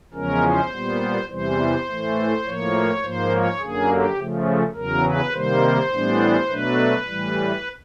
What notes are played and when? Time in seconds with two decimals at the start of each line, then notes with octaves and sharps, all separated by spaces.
0.14 E2 C#3 F3 G#3 C#4 A#4
0.43 C5
0.72 A#2 G3 B3
1.29 E2 C3 E3 G3 C5
1.88 A2 E3 A3
2.44 A2 F3 A#3 C#5
3.02 G#2 F3 A#3 C5
3.32 C#5
3.60 F#2 D3 F#3 A#3 G#4
3.89 G4
4.17 C#3 F3 A3
4.75 E2 C#3 F#3 A#4
5.04 B4
5.33 C3 D#3 G3 A#3 C5
5.90 A2 E3 G3 B3 D4
6.48 B2 F#3 A3 D4 B4
7.06 A2 E3 G3